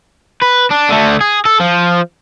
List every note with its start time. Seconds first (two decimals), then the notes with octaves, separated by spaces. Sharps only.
0.42 B4
0.71 D4
0.90 D3 A3
1.21 G#4
1.46 A4
1.60 F3